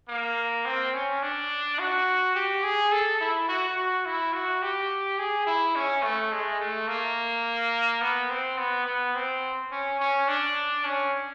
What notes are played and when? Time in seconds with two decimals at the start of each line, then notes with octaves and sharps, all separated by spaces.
0.09 A#3
0.66 C4
0.94 C#4
1.23 D4
1.79 F#4
2.35 G4
2.63 G#4
2.92 A4
3.20 E4
3.48 F#4
3.76 F#4
4.05 E4
4.33 F#4
4.62 G4
5.19 G#4
5.47 E4
5.76 C#4
6.03 A3
6.32 G#3
6.60 A3
6.88 A#3
8.01 B3
8.30 C4
8.58 B3
8.86 B3
9.15 C4
9.72 C#4
10.00 C#4
10.28 D4
10.84 C#4